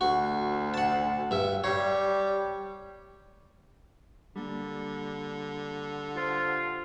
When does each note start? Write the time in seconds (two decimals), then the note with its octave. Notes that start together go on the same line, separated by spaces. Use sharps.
0.01 D2 F#4
0.74 F#5 A5
1.31 G2 E5
1.64 G3 C#5
4.36 D3 G3 A#3
6.16 F4 G4 C5